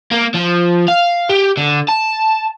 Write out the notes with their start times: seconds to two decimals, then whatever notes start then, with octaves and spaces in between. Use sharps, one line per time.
0.12 A#3
0.35 F3
0.88 F5
1.29 G4
1.57 D3
1.89 A5